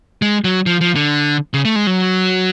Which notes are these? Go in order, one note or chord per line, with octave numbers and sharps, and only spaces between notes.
G#3
F#3
F3
F3
D3
C#3
A3
G#3
F#3